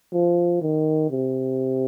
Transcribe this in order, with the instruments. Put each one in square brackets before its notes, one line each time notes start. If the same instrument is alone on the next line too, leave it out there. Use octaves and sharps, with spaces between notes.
[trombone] F3
D#3
C3